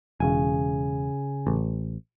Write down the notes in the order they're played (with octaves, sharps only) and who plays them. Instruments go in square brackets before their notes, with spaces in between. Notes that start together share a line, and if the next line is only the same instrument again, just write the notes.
[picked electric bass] E1 [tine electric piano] C#3 G#5
[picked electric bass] A1